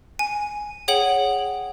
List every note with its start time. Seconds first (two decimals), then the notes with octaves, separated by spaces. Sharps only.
0.19 G#5
0.88 G#4 C#5 F#5 G5 F#7